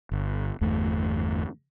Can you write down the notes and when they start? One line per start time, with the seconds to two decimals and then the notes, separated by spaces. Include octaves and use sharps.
0.12 G1
0.61 G1 E2 A3